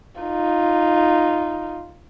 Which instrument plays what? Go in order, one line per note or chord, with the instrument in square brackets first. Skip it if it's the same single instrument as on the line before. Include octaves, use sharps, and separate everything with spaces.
[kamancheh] D#4 F4